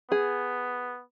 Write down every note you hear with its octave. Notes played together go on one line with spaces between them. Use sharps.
B3 G#4